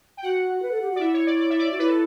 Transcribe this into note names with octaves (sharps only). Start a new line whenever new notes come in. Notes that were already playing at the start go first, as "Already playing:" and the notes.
G5
F#4 F#5
B4
A4
G4
F#4 D5
E4 E5
C#5
D5
D5
E5
D5
F#4
E4 B4
A4